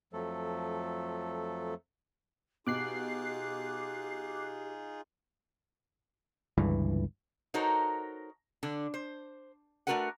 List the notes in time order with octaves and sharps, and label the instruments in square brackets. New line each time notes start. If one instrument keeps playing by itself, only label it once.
[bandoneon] F2 F3 F#3 A3 A4
[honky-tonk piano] B2 [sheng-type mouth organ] D#4 F4 G#4 [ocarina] G4 [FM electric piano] D6 F#6 C7
[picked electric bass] G1 C#2 G2 E3
[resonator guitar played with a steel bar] D#4 F#4 A4 A#4 C5 C#5
D3 D4
C5
A3 D4 F#4 A#4 B4 F#5